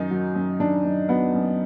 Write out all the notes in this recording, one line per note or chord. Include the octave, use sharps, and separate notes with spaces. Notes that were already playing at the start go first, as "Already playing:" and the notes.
Already playing: F#2 D#3 D#4
F#3
F#2
D#3 D4
F#2
F#3 B3
F#2